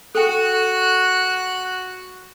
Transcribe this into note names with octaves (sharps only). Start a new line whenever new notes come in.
F#4 A4 G5 F#6